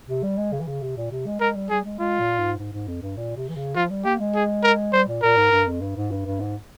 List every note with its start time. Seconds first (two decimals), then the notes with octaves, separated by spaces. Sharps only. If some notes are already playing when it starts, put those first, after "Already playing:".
0.08 C3
0.23 G3
0.37 G#3
0.52 C#3
0.60 E3
0.67 C#3
0.81 C3
0.97 A#2
1.11 C3
1.26 G#3
1.40 G#3 A#4
1.55 G3
1.70 G3 G#4
1.85 G#3
1.99 G#3 F4
2.19 A#2
2.38 G#2
2.58 G#2
2.73 G#2
2.88 F2
3.02 G2
3.16 A#2
3.36 C3
3.49 E3
3.56 C#3
3.75 F3 F4
3.90 G3
4.04 A#3 G4
4.19 G#3
4.34 G#4
4.63 A#4
4.93 G3 C5
5.08 A#2
5.22 A#2 A#4
5.37 G#2
5.51 G2
5.67 F2
5.81 G2
5.96 G#2
6.11 G2
6.25 G2
6.40 G#2